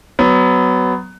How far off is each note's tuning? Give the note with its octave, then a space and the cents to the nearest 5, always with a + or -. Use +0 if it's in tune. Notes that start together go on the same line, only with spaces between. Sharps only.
F#3 +20 B3 +20